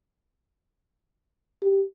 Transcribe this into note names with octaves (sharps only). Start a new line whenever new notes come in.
G4